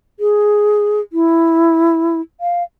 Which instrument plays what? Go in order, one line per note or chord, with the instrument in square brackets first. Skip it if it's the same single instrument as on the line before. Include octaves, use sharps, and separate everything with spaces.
[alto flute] G#4
E4
F5